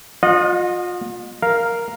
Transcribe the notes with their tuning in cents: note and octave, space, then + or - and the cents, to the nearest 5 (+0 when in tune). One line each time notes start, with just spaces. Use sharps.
F4 +30 D#5 -20 F#5 -40
A#4 +0 F5 +0